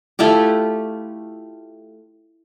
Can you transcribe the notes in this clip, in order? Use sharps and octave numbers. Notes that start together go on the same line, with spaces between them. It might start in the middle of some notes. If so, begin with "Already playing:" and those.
A3 E4 F4 G4